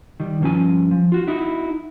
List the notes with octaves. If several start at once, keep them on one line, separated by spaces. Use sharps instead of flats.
D#3 G3
G2 D3 F3 C#4 G#5
F3
F4 F#4
D#4 E4 F#4